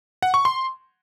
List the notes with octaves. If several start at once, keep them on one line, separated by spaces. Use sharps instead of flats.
F#5
C#6
C6